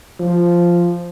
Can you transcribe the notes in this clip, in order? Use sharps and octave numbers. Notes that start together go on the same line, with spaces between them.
F3